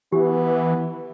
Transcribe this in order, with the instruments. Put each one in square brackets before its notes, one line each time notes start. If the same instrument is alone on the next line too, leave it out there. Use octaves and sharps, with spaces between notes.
[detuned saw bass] E3 [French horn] B3 [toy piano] G4